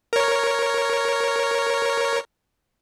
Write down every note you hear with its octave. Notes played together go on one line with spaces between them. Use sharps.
A#4 C#5